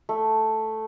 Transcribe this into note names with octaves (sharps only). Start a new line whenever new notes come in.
A3